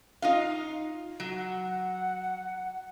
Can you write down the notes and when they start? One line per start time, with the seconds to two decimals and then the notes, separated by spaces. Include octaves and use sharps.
0.22 D#4 F4 F5
1.20 F#3
1.36 F#5